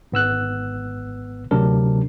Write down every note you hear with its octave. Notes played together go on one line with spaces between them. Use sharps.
G#1 B3 E6 F#6
D2 C3 F#3 D4 A#4